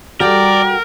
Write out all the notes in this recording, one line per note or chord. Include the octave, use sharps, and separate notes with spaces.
G3 F#4 A4 A#4 D5 G5